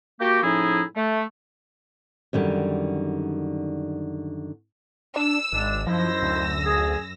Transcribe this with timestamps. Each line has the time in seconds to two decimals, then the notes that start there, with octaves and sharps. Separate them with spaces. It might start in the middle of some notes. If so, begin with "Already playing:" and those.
0.21 A#3 F#4 G4
0.43 A2 F3 C#4 D#4 E4 G#4
0.96 A3
2.33 F#2 D3 D#3 G3
5.16 D4 E6
5.52 G#1 G#3 D4
5.87 F#2 F3 D#4 E4 C5 E6 A#6
6.22 D2
6.65 G#4